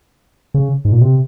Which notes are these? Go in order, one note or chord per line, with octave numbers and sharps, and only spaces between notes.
C#3
G#2
A#2
C3